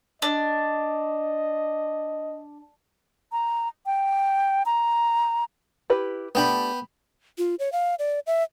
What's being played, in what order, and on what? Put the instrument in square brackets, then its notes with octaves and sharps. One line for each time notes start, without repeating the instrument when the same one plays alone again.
[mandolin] D4 [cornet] D#5
[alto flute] A#5
G5
A#5
[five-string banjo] E4 G4 B4
[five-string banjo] A3 D4 G4 [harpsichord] B3 G5 B5
[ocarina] F4
C#5
F5
D5
E5